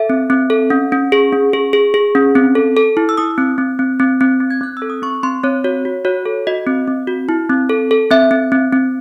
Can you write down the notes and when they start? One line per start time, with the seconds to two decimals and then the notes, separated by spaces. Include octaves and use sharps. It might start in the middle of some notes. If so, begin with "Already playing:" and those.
Already playing: A4 E5
0.10 C4
0.30 C4
0.50 A4
0.70 C#4
0.92 C#4
1.12 G#4
1.33 C#4
1.53 G#4
1.73 G#4
1.94 G#4
2.15 C#4
2.35 C4
2.55 A4
2.77 A4
2.97 E4
3.09 E6
3.17 E4 D#6
3.38 C4
3.58 C4
3.79 C4
4.00 C4
4.21 C4
4.40 C4
4.51 G#6
4.61 C4 F#6
4.77 E6
4.82 A4
4.90 D#6
5.02 C4 C#6
5.23 C4 C6
5.43 C4 C#5
5.64 F#4 C#5
5.85 F#4
6.05 F#4 C#5
6.26 A4
6.47 F#4 D#5
6.67 C4
6.88 C4
7.07 F#4
7.29 E4
7.50 C4
7.69 A4
7.91 A4
8.11 C4 E5
8.31 C4
8.52 C4
8.73 C4